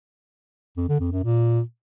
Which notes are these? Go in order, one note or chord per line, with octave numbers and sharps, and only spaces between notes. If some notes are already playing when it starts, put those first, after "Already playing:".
F2
D3
F2
F#2
A#2